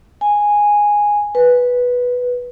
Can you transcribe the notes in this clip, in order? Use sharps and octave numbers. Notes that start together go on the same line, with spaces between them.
G#5
B4